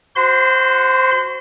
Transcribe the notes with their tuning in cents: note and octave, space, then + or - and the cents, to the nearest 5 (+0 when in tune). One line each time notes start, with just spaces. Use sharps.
F#4 +0 C5 +0 C6 -35